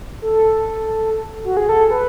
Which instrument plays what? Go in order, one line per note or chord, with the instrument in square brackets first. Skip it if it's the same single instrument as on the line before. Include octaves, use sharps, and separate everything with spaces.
[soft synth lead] A4
F#4
G#4
A4
B4